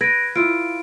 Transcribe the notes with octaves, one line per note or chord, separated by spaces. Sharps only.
B4 G#6 A#6 D7
E4 F4 D7